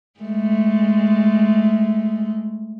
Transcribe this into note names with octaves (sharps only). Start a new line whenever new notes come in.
G#3 A3